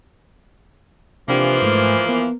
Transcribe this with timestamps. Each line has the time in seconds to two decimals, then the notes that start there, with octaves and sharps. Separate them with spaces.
1.28 C3 E3 F3 A#3 D4 G4
1.62 G#2 A3
2.06 B3 A#4